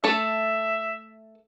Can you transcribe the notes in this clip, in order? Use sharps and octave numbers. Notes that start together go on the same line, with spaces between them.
A3 A4 E5